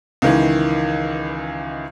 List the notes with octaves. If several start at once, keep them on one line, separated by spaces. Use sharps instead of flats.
C#2 D#3 E3